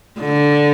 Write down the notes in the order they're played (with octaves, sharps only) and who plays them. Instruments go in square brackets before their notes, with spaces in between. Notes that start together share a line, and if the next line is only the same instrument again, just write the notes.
[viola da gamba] D3